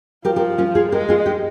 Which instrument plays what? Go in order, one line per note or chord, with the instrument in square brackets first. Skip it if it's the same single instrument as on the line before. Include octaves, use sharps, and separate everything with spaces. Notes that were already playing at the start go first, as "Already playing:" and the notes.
[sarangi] F3 [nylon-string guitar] G4 A#4
[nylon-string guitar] G4 A#4
C#4 F4
F4 G#4
[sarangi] G#3 [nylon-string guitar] G4 A#4
[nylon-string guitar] F4 G#4
D#4 G4